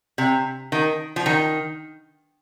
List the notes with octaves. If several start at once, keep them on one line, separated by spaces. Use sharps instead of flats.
C3
D#3
F3
D#3